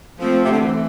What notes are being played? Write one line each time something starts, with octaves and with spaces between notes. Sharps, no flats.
F3 A3 C4
C3
D3
E3